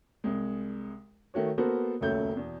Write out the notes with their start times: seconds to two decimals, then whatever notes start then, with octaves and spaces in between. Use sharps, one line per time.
0.24 C2 G#3
1.34 D#3 A3 F#4 C#5
1.58 A#3 B3 F#4 A4 A#4 C5
2.01 D#1 C#2 F#2 A3 G6
2.35 E2 B2